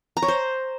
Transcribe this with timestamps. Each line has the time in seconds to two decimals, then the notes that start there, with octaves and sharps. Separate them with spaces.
0.17 A#5
0.22 C#5
0.28 C5